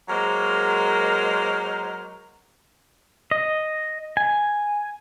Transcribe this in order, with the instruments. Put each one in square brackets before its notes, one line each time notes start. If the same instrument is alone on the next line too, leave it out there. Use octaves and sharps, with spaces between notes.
[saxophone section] F#3 G#3 A#3 A#4 C5
[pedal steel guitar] D#5
G#5